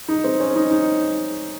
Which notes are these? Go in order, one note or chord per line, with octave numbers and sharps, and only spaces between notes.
D#4
C4
C#4
D#4
D#4